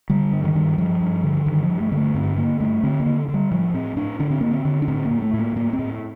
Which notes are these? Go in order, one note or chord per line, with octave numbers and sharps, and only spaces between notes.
D3 G3
G2
D#3
G2
G2 F3
G2
D3
G2 D#3
F3
G2
A3
D3 A#3
A3
G2 C4
D3 A#3
G2 A3
D3 C4
A#3
D3
D3
G3
A2 F3
A2 C4
A2 D4
D3 D4
C4
D3 A#3
C4
D3
D4
A2 C4
A#3
A2
A3
A2
A#3
A2 A#3
C4
A2